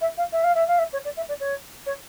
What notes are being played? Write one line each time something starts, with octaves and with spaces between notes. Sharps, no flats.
E5
F5
E5
F5
E5
F5
E5
C#5
D5
E5
D5
C#5
C#5